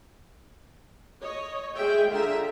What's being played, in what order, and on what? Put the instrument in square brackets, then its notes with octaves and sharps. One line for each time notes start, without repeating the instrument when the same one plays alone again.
[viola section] C#5 D#5
G#3 G#4 E5 G5
D3 F4 G#4 E5 A#5